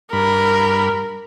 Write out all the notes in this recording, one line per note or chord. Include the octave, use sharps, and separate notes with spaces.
G2 A#4 B5